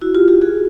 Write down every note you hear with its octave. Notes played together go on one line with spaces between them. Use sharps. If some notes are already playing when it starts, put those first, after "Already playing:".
E4 F#4
F4 G4
F4 G4
F#4 G#4